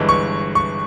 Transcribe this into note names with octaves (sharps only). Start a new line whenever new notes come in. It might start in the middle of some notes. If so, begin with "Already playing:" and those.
Already playing: G1 G2 E3 G#3
C#6
C#6